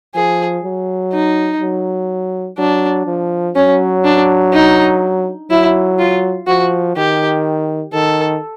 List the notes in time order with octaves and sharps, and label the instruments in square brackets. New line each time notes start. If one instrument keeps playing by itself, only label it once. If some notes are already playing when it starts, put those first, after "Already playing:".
[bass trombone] F3 [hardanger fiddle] G#4
[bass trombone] F#3
[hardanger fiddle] D#4
[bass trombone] F#3
[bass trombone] F#3 [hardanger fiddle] D4
[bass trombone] F3
[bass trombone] F#3 [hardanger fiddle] C#4
[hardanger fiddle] D4
D#4
[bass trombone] F#3 [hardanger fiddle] E4
[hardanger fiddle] F4
[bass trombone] F3 [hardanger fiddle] F#4
[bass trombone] D#3 [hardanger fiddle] G4
[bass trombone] D#3 [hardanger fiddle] A4